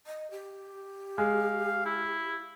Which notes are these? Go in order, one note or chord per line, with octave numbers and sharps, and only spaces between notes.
D#5
G4
G#3 F5
E4